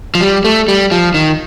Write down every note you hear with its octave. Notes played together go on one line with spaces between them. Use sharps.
F3
G3
A3
G3
F3
D#3